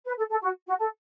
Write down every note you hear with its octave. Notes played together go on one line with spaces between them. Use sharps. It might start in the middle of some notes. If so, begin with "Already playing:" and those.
B4
A4
A4
F#4
F#4
A4